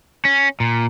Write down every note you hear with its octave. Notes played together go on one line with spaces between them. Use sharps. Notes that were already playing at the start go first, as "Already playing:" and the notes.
C#4
A#2